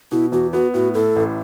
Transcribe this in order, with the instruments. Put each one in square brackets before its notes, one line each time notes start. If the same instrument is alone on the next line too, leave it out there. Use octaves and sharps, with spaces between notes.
[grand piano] B2 [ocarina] E4
[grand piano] E2 [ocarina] F#4
[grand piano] B3 [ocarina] F#4
[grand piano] A2 [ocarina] F#4
[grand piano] A2 [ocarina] A4
[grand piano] A1